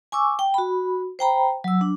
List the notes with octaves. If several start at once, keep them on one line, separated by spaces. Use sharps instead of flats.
G#5 C#6 D6 E6
G5
F#4 B5
C5 G5 A#5 B5
F#3 E6
D4